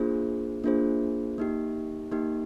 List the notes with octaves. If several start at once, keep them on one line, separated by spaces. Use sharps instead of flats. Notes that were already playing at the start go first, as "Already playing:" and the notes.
Already playing: A#3 D4 F4 G#4 C5
A#3 D4 F4 G#4 C5
A#3 D#4 G4
A#3 D#4 G4